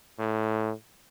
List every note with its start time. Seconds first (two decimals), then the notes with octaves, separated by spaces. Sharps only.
0.19 A2